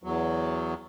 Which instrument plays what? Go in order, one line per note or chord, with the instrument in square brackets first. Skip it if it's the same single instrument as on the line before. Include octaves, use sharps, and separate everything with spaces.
[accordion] E2 F#3